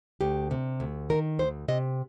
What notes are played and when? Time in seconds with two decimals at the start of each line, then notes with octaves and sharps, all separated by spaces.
0.21 D2 G4
0.51 C3
0.80 D2
1.10 D#3 A#4
1.39 D2 C5
1.68 C3 D#5